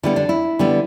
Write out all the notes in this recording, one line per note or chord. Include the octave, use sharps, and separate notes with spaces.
D3 G3 B3 E4
D4
E4
D3 G3 B3